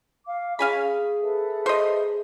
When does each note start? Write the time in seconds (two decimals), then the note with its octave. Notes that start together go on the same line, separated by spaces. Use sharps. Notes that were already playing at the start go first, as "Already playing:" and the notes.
0.25 F5 D6
0.59 C#4 G#4 F5 G#5 B5
1.21 A4 B4 E5
1.66 C5 D#5